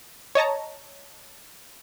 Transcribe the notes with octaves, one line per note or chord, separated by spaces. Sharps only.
C#5 D#5 A5 A#5